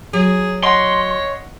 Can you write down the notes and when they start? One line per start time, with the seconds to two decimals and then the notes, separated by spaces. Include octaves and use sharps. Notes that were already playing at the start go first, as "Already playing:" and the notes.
0.13 F#3 G#4
0.63 C#5 D#5 F#5 C6